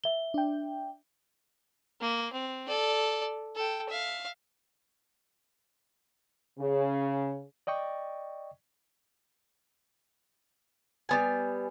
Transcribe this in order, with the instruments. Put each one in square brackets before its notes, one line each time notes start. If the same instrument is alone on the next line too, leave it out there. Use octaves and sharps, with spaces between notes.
[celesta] E5 G7
[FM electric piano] D4 G5
[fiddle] A#3
C4
A4 D5
A4 G5
E5 F5
[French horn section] C#3
[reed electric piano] D5 D#5 G5 C#6
[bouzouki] G3 B3 G#5